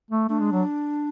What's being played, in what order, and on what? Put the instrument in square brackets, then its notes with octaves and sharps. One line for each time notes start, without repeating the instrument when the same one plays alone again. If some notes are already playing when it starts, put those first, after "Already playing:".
[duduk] A3
[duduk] A3 [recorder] D4
[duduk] G#3
F#3